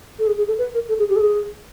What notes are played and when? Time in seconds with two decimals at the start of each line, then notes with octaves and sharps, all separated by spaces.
0.19 A4
0.27 G#4
0.38 G#4
0.48 A4
0.58 B4
0.74 A#4
0.89 A4
0.99 G#4
1.09 G4
1.16 A4
1.20 G#4